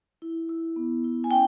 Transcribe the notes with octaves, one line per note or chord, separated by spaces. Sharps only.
E4
E4
B3
E4
G#5
C#4 G5